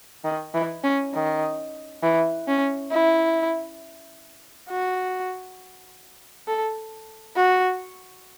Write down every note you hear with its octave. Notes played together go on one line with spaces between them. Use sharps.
D#3
E3
C#4
D#3
E3
C#4
E4
F#4
A4
F#4